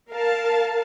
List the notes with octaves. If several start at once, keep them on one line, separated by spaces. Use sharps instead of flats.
A#4 F5 A5